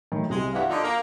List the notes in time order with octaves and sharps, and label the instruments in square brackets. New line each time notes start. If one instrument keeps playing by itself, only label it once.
[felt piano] A2 D#3
[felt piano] C2 C3 [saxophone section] G#3
[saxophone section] G2 E3 [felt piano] F5 F#5
[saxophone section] D3 D#4 [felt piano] F4
[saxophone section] A#3 [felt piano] F5